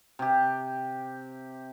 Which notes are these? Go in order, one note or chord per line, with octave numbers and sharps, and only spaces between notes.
C3 G4